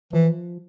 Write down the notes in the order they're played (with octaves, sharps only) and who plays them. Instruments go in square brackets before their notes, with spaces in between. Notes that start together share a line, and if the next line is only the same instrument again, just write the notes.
[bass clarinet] E3 [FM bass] F3